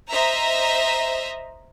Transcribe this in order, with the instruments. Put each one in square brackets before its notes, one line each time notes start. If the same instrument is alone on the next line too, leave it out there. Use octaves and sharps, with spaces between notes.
[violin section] C5 D#5 E5 A#5